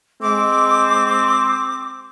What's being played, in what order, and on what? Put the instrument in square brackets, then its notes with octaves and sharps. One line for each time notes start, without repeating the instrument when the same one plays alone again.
[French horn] G#3 [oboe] C4 [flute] D6